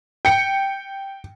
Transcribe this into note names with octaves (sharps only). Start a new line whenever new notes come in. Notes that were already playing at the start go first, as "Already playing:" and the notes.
G5 C#7